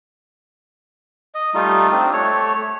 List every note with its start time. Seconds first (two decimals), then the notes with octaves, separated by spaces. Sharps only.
1.35 D#5
1.54 G3 A3 D#4 F4
1.91 C4 D4
2.13 A3 C#5